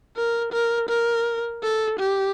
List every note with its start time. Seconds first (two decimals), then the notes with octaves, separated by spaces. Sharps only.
0.16 A#4
0.52 A#4
0.89 A#4
1.63 A4
1.99 G4